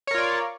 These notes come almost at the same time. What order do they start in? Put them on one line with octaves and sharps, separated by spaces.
C#5 A#4 F4 D5